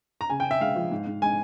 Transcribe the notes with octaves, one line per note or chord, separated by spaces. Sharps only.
A#5
C#3 G#5
G5
C#3
E5
G#3 F5
F3
G#2
G#2
G#3 G#5